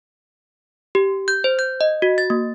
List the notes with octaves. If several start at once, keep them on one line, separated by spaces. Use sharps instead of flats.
G4
G6
C5
G6
D#5
F#4
A6
A#3